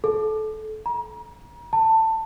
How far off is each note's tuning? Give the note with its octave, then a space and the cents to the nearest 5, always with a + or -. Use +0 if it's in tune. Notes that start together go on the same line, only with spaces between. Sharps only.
A4 -25
A#5 +35
A5 +20